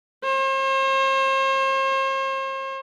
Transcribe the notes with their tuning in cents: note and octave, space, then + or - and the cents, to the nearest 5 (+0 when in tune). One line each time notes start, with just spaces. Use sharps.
C5 +45